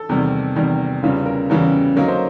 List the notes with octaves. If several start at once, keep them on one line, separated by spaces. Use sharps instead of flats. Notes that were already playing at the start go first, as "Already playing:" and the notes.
Already playing: A4
E2 C3 D#3 G3
E2 C3 D#3 G3
E2 C#3 E3 G3 F4
A#4
E2 C#3 E3 G3
D3 F#3 A#3 D#4 A#4
C5